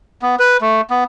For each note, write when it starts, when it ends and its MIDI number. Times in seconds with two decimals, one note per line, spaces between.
0.22 0.36 59
0.39 0.57 71
0.61 0.81 57
0.90 1.04 59